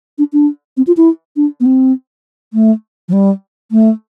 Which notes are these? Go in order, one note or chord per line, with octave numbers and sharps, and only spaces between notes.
D4
D4
C4
F4
E4
D4
B3
C4
A3
F3
G3
A3